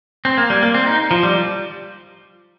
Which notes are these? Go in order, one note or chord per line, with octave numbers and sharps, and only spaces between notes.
C4
A#3
G3
A#3
C4
D#4
F3
G3